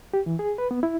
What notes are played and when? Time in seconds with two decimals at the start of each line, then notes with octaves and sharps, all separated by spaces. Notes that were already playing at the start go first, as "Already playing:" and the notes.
0.14 G4
0.26 E3
0.39 G#4
0.58 B4
0.71 B3
0.83 E4